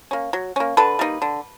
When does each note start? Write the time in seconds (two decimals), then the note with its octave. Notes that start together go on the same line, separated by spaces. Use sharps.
0.11 A#3 C#4
0.33 F#3
0.56 A#3 C#4
0.77 D3 A4 B4
0.99 G3 A#3 D#4
1.22 D3